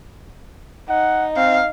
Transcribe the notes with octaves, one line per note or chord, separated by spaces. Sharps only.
D#4 F#5
C4 F5